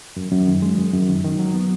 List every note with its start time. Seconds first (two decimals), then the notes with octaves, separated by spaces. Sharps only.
0.16 F#2
0.32 F#2
0.47 D#3
0.62 G#3
0.78 F#2
0.93 F#2
1.09 D#3
1.24 D#3
1.39 F#3
1.54 B3